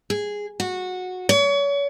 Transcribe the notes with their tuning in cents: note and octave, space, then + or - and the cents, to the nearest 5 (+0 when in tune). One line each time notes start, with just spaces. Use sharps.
G#4 -5
F#4 -15
C#5 +35